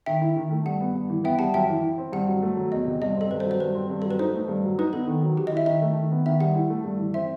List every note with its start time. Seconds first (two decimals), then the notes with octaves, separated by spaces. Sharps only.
0.06 D#3 E5 G5
0.22 E4
0.37 D#3
0.51 A3
0.65 G2 F#5
0.81 B3
0.95 G2
1.10 E3
1.24 B3 E5 G5
1.39 G3 F#5 A5
1.54 F#2 E5 G5
1.69 E3
1.83 E4
1.98 C4
2.13 G2 F#5
2.27 F#3
2.42 A3
2.57 F#3
2.72 E2 D#5
2.86 C3
3.02 G2 D#5
3.16 C4
3.21 A4
3.31 G2 B4
3.40 C5
3.46 F#3
3.51 C5
3.60 G2 B4
3.75 C4
3.90 G2
4.02 F#3 A4
4.11 B4
4.19 D#4 C5
4.34 A3
4.48 G2
4.64 F#3
4.79 D#4 B4
4.93 B3 A4
5.07 D#3
5.23 F#3
5.37 D#3 G4
5.47 D#5
5.52 E4 E5
5.66 D#3 E5
5.82 A3
5.97 D#3
6.12 B3
6.26 D#3 E5
6.40 G3 F#5
6.55 E4
6.70 A3
6.85 G2
6.99 E3
7.14 C4 E5